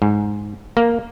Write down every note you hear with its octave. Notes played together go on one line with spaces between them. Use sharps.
G#2
A#3